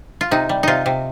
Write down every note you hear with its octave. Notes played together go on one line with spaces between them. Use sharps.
F4
C3 D#4
G3
C3 D#4 F4
C3